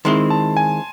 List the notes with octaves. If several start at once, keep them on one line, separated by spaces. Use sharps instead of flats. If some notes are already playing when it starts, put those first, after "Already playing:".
D#3 G#3 C4 E4 C6
A5
G#5